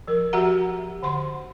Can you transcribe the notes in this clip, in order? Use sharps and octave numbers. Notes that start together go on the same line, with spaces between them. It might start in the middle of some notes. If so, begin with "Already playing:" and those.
F3 A#4
F3 F#4 G4 E5 F#5 A#5
D3 F#5 C6